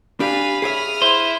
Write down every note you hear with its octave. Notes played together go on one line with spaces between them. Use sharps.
D4 G4 F5 G#5 B5
G#4 C#5 E5 D#6 F6
E4 C5